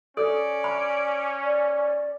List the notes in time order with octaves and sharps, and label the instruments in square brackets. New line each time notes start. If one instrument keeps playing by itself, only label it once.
[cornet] C#4 [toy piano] A4 [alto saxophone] D5
[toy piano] B5
[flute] D5